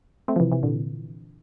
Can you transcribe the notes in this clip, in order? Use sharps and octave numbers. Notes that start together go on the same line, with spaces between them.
A3 C4
F3
C3 E3
C3 E3
A#2 D3